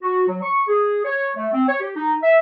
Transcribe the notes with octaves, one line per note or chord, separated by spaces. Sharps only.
F#4
F#3
C#6
G#4
C#5
A3
C4
C#5
G4
D#4
E5